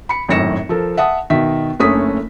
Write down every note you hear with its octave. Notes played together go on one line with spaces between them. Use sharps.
B5 C#7
G#1 F#2 A2 A#6 C#7 E7
F3 A4 A#4
E5 F#5 A5 D#6
B2 D#3 E5 B6
F#1 A3 C#4 D4 D#6 B6